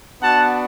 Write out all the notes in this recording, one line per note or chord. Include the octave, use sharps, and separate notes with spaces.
B3 D4 F#4 F#5 A5